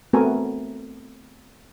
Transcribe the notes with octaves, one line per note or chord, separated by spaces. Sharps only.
A3 B3 C4 F#4 A#4 G#5